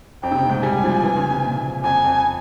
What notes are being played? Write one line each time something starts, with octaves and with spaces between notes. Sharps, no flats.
F2 G5
C3
C#3
A#2
G#2
G3 G#5
F3
E3
C#3
C3
A#2
F2 G#5
F2